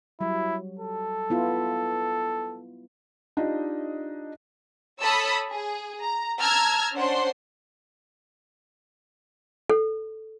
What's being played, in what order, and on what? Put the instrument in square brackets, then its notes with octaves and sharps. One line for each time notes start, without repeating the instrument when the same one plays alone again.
[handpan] F#3 G3 [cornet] E4
[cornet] A4
[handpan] B3 E4 F4
[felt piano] D4 D#4 F4 G4 D#5
[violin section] A4 C#5 A5 B5 D#6 E6
G#4
A#5
A5 A#5 E6 F6 G#6
C#4 D4 C5 F#5 C6
[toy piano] A4